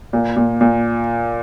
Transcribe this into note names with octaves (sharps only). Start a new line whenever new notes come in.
A#2
A#2
A#2